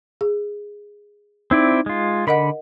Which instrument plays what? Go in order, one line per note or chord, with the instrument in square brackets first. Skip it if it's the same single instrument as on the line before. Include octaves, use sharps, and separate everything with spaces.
[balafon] G#4
[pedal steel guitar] C4 E4 D5 [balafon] D#4
[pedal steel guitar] G#3 F4
[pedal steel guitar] D3 B5 [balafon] A#4 D#5 F#5